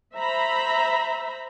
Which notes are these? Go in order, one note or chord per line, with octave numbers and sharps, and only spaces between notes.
C5 E5 A#5 B5